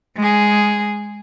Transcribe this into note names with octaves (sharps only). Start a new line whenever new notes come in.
G#3 G#4